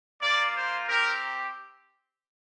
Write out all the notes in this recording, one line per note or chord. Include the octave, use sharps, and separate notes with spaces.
A#3 F4 D5
C5
C4 G4 A#4